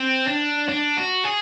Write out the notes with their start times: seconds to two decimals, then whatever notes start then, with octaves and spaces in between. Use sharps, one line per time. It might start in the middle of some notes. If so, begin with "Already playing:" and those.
Already playing: C4
0.28 D4
0.69 D4
0.97 F#4
1.24 G#4